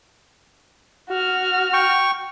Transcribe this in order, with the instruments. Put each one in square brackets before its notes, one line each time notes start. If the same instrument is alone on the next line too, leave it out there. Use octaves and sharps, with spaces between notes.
[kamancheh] F#4 F6
[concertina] G5 C#6